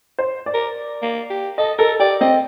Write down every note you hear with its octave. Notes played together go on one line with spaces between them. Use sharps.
C5
D5
A#4
A#3
G4
A4 D#5
A4 A#4
G4 D5
C4 D#5